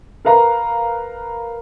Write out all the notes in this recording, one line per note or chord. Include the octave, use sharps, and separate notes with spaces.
A#4 B4 F5 A#5